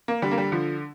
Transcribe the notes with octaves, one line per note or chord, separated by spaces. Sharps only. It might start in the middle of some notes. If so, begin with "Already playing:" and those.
A#3
D3 G3
A#3
G3
D3 F3